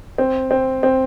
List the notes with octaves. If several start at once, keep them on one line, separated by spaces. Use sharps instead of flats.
C4
C4
C4